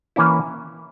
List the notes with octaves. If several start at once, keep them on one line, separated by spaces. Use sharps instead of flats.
E3 A#3 C#4 E4